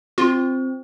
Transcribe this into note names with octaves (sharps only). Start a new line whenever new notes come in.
C4 F4